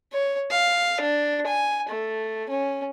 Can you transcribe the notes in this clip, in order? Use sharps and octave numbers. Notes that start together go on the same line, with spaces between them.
C#5
F5
D4
G#5
A3
C#4